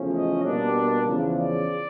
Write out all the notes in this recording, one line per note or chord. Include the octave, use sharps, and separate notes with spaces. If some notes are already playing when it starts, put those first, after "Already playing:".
Already playing: E2 C#3 F3 A3 C#4
D#5
B2 G3 A#3 D4
E2 C#3 F3
D5